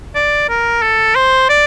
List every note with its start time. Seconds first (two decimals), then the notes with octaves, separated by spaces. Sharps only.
0.15 D5
0.49 A#4
0.82 A4
1.15 C5
1.49 D5